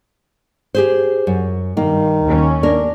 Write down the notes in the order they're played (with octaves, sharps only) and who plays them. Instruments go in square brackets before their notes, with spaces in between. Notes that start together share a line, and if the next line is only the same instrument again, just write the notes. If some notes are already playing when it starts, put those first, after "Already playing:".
[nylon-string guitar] G4 G#4 C5
F#2
[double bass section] G2 [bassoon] D#3 [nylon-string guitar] A#3
[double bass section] D#2 C#4
[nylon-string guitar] A#3 A#4 [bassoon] D4